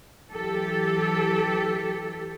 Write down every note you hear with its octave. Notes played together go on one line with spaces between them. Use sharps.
E3 F#3 G4 A4